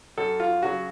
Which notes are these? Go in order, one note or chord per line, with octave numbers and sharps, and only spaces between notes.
F#2 A4
F4
C#3 F#3 F#4